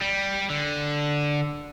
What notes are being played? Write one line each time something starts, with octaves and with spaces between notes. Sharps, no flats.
G3
D3